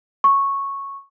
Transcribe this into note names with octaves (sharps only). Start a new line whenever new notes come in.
C#6